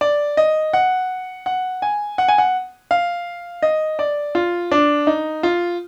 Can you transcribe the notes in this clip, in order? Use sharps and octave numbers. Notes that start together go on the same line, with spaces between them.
D5
D#5
F#5
F#5
G#5
F#5
G#5
F#5
F5
D#5
D5
F4
D4
D#4
F4